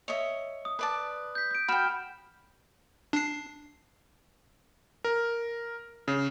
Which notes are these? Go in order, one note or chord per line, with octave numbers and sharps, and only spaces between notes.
C#5 D#5 E5
D#6
B4 D5 A5
G6 B6
G6 D7
F#4 G5 B5 F6 E7
D4 C7
A#4
C#3